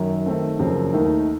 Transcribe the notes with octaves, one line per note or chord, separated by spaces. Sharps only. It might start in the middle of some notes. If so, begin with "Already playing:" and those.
Already playing: F#2 D#3 F#3
D#3 A3 C4
F#1 F2 C#3 F#3 C4
D#2 D#3 A3 D#4